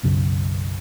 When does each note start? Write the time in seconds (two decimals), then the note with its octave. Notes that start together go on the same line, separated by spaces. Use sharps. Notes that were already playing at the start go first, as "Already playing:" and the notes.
0.03 B1 F#2 C#3